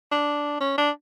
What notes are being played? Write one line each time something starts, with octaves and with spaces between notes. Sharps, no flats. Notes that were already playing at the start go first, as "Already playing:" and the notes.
D4
C#4
D4